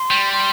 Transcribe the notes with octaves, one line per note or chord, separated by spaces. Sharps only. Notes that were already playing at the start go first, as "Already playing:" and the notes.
Already playing: C6
G3
C6